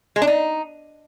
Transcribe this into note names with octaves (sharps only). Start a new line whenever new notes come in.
G#3
D4
D#4